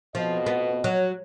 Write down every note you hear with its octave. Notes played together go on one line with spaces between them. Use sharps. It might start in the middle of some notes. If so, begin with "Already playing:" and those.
F2 B2 F3 D#5
B3
F#3